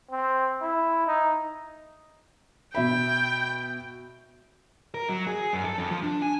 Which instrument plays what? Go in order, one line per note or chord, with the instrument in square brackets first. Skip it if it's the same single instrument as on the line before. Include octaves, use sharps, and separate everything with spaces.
[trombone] C4
E4
D#4
[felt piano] B2 E5 B5 [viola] G5
[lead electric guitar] A#4
F#3
G#4
F#2
A4
F2
F3
D4
G#5